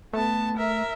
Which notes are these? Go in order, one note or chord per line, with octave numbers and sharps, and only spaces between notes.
A3 B3 A5
A#4 E5